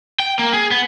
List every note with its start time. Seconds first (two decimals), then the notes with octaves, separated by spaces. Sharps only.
0.20 G5
0.39 A#3
0.53 G#4
0.71 B3